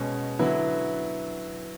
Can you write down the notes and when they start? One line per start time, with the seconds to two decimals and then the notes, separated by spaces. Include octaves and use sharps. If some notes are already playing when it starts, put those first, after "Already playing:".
Already playing: B2 G#3 C#4
0.39 D3 F#3 B3 E4